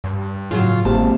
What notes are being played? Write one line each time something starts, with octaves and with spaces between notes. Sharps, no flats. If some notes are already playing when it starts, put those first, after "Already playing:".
G2
A2 C#3 F#3 F4
G#1 C3 A#3 A5